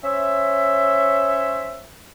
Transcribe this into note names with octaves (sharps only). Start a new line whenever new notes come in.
C#4 C5 C#5 E5